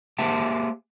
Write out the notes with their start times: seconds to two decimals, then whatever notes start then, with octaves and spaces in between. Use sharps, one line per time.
0.18 A#3 G4 G#4 C5 E5 A5